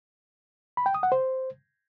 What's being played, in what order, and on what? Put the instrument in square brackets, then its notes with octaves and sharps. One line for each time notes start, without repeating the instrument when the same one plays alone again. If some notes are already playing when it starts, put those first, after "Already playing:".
[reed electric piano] B5
G5
D#6
F#5
C5